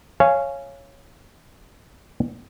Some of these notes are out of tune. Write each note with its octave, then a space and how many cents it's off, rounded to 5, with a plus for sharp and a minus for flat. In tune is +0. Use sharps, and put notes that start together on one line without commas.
C#5 -5 F5 -20 G#5 +0